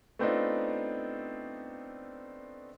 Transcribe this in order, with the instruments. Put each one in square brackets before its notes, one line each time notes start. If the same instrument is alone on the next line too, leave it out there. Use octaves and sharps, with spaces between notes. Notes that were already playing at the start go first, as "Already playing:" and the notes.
[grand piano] A3 B3 C4 D4 D#4 F4